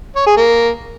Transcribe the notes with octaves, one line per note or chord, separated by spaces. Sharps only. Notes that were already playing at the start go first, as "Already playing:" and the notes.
C#5
G#4
A#3